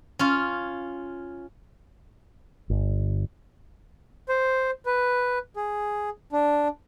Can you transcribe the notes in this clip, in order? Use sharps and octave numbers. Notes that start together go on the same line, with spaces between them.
C#4 F4
G1
C5
B4
G#4
D4